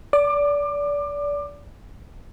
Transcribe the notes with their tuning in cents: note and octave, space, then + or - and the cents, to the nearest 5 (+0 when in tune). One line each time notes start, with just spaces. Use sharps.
D5 -25 D6 +25